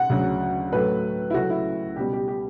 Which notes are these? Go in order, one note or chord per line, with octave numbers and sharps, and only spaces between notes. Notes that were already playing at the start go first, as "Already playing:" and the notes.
Already playing: F#5
D2 C#3 F#3
A2 F#3 A3 B4
E4
C#2 C#3 F#3 A3 F#4
E4
C#2 B2 G3 G4
G4
G4